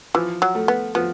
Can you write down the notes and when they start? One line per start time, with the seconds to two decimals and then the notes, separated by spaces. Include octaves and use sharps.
0.14 E3 F3
0.42 F#3
0.55 A3
0.68 B3
0.95 F3 B3